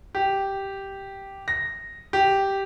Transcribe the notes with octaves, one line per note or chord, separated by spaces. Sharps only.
G4
A#6
G4